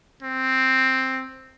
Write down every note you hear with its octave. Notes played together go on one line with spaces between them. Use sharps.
C4